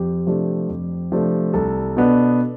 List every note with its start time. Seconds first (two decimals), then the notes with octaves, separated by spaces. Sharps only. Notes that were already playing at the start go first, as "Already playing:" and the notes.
Already playing: F2 G4
0.26 C3 F3 A3 D4
0.69 F2
1.12 C3 F3 A3 D4
1.53 C2 A4
1.97 B2 B3 D4